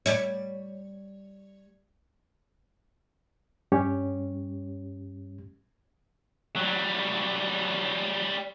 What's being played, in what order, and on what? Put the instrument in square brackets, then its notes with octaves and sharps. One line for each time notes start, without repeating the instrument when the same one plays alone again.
[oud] G3 C#5
[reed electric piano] G2 G3 C#4 G4 C#5
[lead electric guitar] F#3 G3